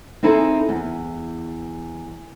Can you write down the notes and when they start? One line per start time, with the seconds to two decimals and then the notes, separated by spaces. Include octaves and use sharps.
0.23 C4 D#4 E4 G#4 A4
0.69 E2